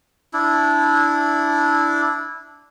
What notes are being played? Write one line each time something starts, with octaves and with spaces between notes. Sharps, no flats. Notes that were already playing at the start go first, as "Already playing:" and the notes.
D4 E4